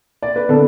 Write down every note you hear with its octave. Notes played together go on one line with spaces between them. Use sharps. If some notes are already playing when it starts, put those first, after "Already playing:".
D5
B4
D3 B3 D4 A4